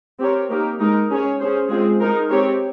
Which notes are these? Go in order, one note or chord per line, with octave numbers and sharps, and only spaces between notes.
C4 G4 A#4 C#5
A#3 D#4 G4 A#4
G#3 D#4 A#4
C#4 G#4 C#5
C#4 G#4 C5
G#3 C4 F4 G#4
G#3 D#4 A#4
C4 G4 C#5